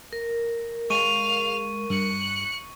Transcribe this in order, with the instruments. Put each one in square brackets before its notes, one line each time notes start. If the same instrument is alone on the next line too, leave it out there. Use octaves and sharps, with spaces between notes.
[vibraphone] A#4
[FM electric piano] G#3 [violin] F5 F7 [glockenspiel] C#6 D#7
[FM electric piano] G2 [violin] F#6 C#7